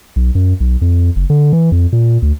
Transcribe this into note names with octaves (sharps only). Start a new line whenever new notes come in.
B1
F#2
B1
F2
F#1
D3
E3
F2
A#2
D2